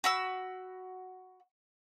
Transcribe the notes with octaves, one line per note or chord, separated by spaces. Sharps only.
F#4 B5 E6